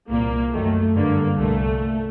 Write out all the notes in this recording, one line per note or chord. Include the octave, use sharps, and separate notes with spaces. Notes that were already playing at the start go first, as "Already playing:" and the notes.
C2 A#2 A#3
F#2 D#3 A3
G2 D3 A#3
C2 A#2 A3